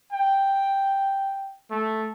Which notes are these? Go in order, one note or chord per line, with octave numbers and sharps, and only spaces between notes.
G5
A3